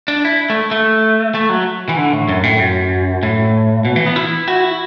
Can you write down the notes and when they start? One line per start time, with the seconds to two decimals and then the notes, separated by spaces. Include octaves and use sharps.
0.08 D4
0.25 E4
0.50 A3
0.71 A3
1.35 A3
1.49 F#3
1.89 E3
1.97 D3
2.13 A2
2.29 F#2
2.43 A2
2.60 F#2
3.23 A2
3.85 B2
3.96 E3
4.06 B3
4.16 E4
4.48 F#4
4.64 E4